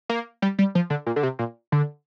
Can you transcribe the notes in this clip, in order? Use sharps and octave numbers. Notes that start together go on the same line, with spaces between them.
A#3
G3
G3
F3
D3
A#2
D3
C3
A#2
D3